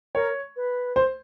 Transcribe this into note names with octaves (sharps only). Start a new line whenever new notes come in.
A#4 C#5
B4
C5